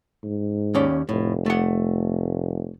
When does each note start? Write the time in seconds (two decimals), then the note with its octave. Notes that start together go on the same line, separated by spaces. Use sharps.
0.23 G#2
0.74 D#2 C#4 D5
1.09 F1 A2
1.46 A3 F#5